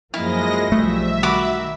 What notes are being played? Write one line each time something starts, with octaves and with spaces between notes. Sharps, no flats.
F#2 F3 G#3 A#3 E4 D#5 F5 A#6
B1 F3 G3 A3 E5
D#3 F#4 B5 D6